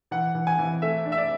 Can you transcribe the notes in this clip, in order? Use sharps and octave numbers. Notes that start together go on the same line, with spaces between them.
E3 F#5
E3
G#5
E3
A3 E5
D4
E5
D5